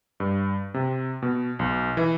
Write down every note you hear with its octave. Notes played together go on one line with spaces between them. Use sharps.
G2
C3
B2
B1
E3